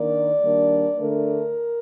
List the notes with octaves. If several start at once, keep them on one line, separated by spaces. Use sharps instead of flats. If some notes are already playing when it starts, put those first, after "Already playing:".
Already playing: D#3 A#3 D4 D5
D#3 G3 A#3 D4
D3 A3 D4 A#4